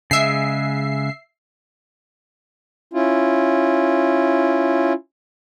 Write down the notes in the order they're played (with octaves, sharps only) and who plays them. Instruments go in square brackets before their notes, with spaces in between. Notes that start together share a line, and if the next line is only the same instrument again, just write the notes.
[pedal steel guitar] C#3 G#3 [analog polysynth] E5 C7
[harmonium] C#4 E4 F4